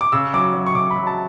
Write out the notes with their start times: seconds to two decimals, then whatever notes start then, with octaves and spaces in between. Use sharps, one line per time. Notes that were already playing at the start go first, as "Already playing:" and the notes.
0.01 D6
0.12 C#3 E6
0.34 F#3 D6
0.54 F#3
0.66 C#6
0.75 C#3 D6
0.91 B5
0.96 F#3
1.07 A5